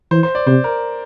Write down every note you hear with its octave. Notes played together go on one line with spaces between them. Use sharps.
E3 C5
C5
D5
C3 C5
A#4